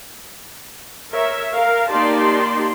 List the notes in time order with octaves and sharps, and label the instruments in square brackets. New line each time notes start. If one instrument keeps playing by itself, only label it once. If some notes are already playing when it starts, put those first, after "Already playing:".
[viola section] A#4 C#5 E5
A#4 F5
A#3 D#4 G4 D5 A5 C6